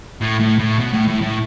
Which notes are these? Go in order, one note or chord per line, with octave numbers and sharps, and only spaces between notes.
A2
A2
A2
B2
A2
A2
A2